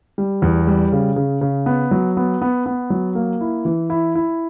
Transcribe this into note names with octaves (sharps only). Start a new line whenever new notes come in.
G3
E2
G3
C#3
C#3
C#3
B3
F#3
B3
B3
B3
F#3
A#3
E4
E3
E4
E4